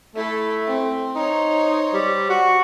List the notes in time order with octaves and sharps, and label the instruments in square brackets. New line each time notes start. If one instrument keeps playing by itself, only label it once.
[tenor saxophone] A3 [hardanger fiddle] E4 A4
[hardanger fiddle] C4
[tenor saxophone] D#4 [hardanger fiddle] C5 C#5
[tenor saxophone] G3
F#4